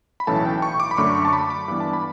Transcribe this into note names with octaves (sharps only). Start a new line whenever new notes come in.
B5
B1 A2 E3 A3 C#4 A5
G5
C#6
D6
B5
F#2 D3 A3 C#6
C#6
A5
B5
D6
G2 E3 B3 B5
A5
B5